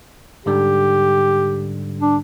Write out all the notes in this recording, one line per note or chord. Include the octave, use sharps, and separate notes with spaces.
G#2 D3 G3 G4
D4